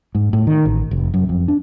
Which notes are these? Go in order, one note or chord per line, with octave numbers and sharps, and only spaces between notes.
G#2
A2
D#3
A1
F1
F#2
F2
D4